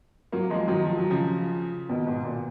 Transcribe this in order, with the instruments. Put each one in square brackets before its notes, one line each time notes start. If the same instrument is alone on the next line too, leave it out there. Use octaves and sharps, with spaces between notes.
[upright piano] F#3 A#3
F3 G#3
D#3 F#3
F3
F#3
C#3 F3
B2 D#3
G#2 B2
A#2